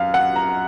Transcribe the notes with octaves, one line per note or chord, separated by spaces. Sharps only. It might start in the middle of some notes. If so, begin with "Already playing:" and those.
Already playing: F#2 F5
F#5
A#5